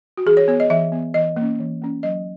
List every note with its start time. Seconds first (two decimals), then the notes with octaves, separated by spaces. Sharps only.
0.17 F#4
0.26 E3 G#4
0.37 C#5
0.48 B3 C#5
0.60 D#5
0.70 E3 E5
0.92 B3
1.14 E3 D#5
1.36 A#3 C#4
1.60 E3
1.82 A#3 C#4
2.03 F#3 D#5